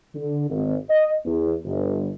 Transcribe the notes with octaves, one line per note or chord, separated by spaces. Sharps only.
D3
G#1
D#5
E2
G1